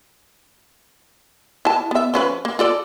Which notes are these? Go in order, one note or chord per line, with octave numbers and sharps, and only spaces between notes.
E4 A5
B3 E5
F3 C#4 B4
A#3
F4 A4 D5